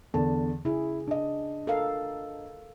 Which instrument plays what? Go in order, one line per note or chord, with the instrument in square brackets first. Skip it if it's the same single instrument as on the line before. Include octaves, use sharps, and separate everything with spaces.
[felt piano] E2 D3 A5
[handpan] C#3 G#4 [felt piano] E4
[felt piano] D4 D#5
[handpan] A4 A#4 F5